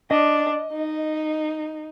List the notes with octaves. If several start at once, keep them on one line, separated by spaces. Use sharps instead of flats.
D4 D#5
D#4